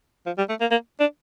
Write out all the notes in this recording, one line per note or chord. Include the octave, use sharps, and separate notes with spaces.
F3
G3
A3
A#3
A#3
D4